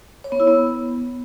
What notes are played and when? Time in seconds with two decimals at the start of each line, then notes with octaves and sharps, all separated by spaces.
0.24 C#5
0.32 B3
0.40 E4
0.47 B3